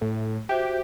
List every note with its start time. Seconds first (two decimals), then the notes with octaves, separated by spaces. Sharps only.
0.01 A2
0.49 F#4 G4 C5 E5